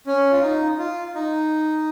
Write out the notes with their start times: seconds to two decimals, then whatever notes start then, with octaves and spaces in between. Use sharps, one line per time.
0.07 C#4
0.31 F4
0.42 D#4
0.79 F4
1.15 D#4